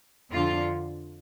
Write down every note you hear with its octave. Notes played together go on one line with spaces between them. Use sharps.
F2 D3 F4